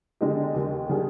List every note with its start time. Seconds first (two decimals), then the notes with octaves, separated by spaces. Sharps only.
0.21 D3 G#3 D#4 G4
0.54 D#2 D#3 G#3
0.89 D#3 G3 D4 G#4